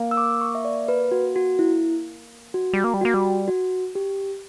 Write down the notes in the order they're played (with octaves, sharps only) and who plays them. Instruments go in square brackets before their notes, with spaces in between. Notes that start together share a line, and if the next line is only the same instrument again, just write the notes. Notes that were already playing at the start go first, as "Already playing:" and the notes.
Already playing: [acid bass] A#3
[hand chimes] E6
D6
C#6
E5
D5
B4
F#4
F#4
E4
[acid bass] G3 [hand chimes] F#4
[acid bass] A#3
G3
A#3
G3
[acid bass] A#3 [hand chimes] F#4
[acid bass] G3
[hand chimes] F#4
G4